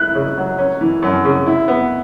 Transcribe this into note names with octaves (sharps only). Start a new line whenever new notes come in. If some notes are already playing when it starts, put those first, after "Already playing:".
Already playing: E4 F#6
C#3
F#3
C#4
E3
F#2
C#3
E4
B3